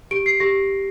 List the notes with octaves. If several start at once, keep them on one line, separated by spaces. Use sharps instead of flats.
G4 D7
C7
G4 A#6